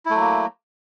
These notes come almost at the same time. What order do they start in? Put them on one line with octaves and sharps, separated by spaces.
E4 A3 F#3 A#3